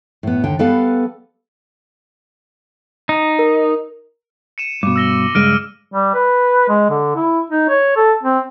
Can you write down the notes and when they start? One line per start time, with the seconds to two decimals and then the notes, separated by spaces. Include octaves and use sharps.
0.23 A2 B3
0.44 D#2 D3 G5
0.59 G3 B3 A4 B4 F5
3.09 D#4
3.39 A#4
4.58 C#7 D#7 E7
4.83 G2 B2 D6 E7
4.96 E6 A#6 G7
5.35 C#2 G2 G#3 F6 D7 D#7
5.92 G3
6.14 B4
6.68 G#3
6.90 D3
7.15 E4
7.50 D#4
7.69 C#5
7.97 A4
8.23 C4